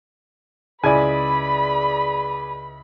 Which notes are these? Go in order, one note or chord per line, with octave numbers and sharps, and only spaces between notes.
C#2 E4 G#4 B4 D5 G#5 B5